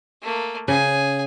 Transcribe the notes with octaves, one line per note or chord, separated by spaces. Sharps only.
A3 A#3
C#3 G#4 G#5